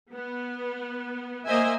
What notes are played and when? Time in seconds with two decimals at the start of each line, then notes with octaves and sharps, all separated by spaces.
0.13 B3
1.46 A#3 C5 D#5 E5 G#5